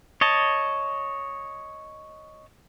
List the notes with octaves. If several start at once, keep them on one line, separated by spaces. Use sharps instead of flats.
C#5 D#5 A5